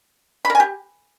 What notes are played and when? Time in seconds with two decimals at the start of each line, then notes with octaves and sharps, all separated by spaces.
0.45 B5
0.50 A#4
0.55 G#5
0.60 G4